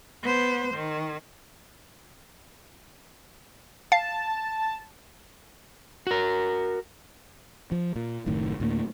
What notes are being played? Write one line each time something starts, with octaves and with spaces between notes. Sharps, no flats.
B3 C5
D#3
F5 A5
F#4 A#4
F3
A#2
F#1 A2 D#3
D2 A2 A#3